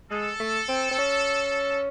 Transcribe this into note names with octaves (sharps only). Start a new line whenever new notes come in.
G#3 A4
A3
C4
C4
C#4